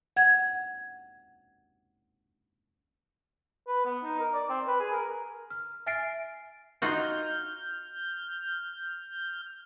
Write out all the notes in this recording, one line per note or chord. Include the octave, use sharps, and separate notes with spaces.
F#5 G#6
B4
B3
D#4
A#4
D5
C4
B4
G#4
A#4
F6
E5 G#5 F6 A6 C7 D7
D#4 F4 F#4 F6 G6